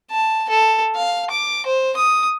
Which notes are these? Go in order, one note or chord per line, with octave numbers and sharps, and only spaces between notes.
A5
A4
F5
D6
C5
D#6